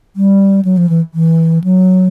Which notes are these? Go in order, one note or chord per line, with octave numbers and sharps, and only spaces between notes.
G3
F#3
F3
E3
E3
F#3